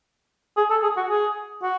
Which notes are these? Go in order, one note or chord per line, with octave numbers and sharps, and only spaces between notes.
G#4
A4
G#4
F#4
G#4
F#4